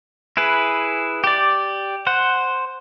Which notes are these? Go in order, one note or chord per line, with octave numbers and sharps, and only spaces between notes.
E4 G#4 B4
G4 D5
C5 F#5